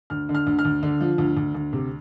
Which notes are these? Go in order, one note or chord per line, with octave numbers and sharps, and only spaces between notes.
D2 F6
D3
F6
D2
F6
D2
D3
F3
D2
D2
D2
C3